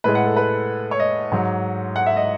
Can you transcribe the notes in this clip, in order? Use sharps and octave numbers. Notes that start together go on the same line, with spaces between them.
A2 G#3 B4
F#5
A4
B4
C#5
D#5
G#2 F#3
F#5
E5
D#5